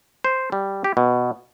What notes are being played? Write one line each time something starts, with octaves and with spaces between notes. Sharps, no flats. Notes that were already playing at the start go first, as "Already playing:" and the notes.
C5
G3
G4
B2